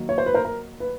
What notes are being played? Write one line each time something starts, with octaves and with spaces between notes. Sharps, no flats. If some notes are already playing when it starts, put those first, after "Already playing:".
Already playing: D#3 F#3 A#3
C#5
C5
B4
A#4 C5
A#4
B4